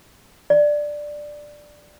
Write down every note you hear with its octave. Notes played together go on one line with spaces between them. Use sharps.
D5